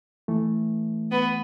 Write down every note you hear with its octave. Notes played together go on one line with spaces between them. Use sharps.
E3 A3
B3